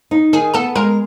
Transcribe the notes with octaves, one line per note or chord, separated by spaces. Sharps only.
D#4
D#3 G#4 G#5
B3 A4 A5
G#3 A#4 A#5